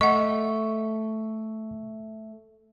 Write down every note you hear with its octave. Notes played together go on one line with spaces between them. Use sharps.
A3 D#5 F#5 C#6